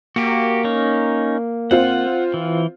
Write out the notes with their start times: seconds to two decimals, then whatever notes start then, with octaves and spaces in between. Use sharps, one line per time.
0.16 A#3 F#4 G4
0.64 C#4 D#4 C#5
1.71 C4 F4 F5 F#5
2.34 E3